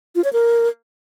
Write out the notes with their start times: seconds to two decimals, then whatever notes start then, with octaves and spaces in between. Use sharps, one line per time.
0.15 F4
0.24 C#5
0.33 A#4